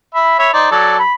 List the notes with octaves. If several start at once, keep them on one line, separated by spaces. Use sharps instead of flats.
E5 B5
C#5 E5 B5
D#4 C5 D5
F#3 A4 D5
B5